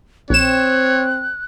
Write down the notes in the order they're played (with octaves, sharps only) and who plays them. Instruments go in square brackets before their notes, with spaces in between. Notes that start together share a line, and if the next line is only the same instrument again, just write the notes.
[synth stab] A#1 E7 [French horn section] C4 [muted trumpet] C#5 [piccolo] F#6